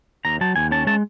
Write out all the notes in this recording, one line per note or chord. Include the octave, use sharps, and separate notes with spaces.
D#2 A#5
F#3 A5
D#2 G#5
C#4 A5
G#3 A5